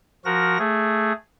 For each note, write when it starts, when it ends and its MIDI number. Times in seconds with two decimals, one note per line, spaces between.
0.25 0.58 53
0.25 0.58 66
0.25 0.58 70
0.25 0.58 94
0.59 1.13 57
0.59 1.13 68